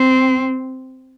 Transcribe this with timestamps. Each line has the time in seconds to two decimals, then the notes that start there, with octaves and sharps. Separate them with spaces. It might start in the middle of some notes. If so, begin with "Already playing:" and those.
Already playing: C4